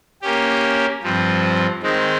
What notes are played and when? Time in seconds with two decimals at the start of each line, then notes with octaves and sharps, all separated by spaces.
0.22 A#3 C#4 G4
1.03 G2 F3 C4
1.83 D#3 G#3 C4 D#4